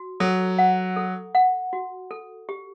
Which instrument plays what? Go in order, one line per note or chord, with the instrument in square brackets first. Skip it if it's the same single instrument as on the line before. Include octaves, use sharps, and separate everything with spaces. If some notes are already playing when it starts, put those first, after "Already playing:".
Already playing: [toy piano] F#4
[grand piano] F#3 [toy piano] A4
[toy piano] F#5
A4
F#5
F#4
A4
G4